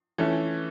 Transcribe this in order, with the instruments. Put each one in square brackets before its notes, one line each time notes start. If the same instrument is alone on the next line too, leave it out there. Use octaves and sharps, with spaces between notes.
[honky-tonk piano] E3 A3 C#4